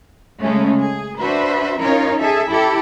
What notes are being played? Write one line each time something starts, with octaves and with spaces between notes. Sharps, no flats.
C#3 G#3 A3 C#4
G#4
D4 F#4 B4 C5 E5
C#4 D#4 F4 A#4 C#5
G#4 A4 E5
E4 G4 A4